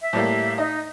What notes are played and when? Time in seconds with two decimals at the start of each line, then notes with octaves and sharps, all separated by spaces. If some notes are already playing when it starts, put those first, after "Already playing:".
0.01 E5
0.13 A2 G3 A#3
0.58 D#4 D#5